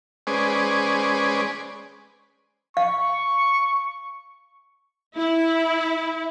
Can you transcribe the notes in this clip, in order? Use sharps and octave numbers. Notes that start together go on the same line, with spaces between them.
G#3 C#4 G#4 B4 C5 D5
F5 C#6
E4